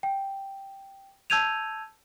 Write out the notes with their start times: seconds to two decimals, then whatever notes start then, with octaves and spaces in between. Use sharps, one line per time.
0.03 G5
1.30 A5 E6 G6 G#6 D#7 F7